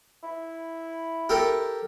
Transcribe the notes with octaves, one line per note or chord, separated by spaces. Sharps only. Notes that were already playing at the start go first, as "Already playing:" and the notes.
E4
G4 A4 A#4